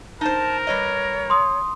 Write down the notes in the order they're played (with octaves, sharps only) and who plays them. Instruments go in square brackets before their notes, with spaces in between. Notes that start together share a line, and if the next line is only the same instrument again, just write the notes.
[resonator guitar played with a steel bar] D#4 C5 [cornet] A#4 [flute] A5
[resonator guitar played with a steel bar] G3 B4 D#5 [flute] C#5
[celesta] C6 D#6